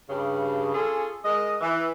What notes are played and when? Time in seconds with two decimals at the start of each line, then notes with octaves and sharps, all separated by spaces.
0.09 G2 C#3
0.75 C#4 F4 G#4 A4
1.24 G#3 A#4 D#5
1.61 E3